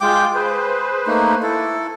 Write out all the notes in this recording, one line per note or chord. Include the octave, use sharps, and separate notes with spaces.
G#3 F4 G5 D6 G6
G#4 B4 C5
A3 A#3 D#4
E4 A4